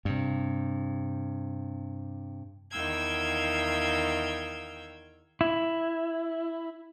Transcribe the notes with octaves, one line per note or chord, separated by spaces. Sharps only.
G2 C3
E2 D#3 F5 G5 E6 G#6
E4